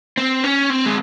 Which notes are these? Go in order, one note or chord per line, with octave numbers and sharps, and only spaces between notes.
C4
C#4
C4
G#3